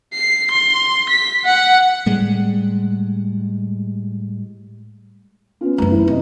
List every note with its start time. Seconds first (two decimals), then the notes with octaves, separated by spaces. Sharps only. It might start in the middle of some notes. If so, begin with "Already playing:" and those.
0.13 C7
0.51 C6
1.09 B6
1.45 F#5
2.06 A2 G3 G#3
5.61 B3 C#4 F4
5.78 F#2 A3 B4 A#5
5.92 E3 B4
6.08 C3 D#4 D#5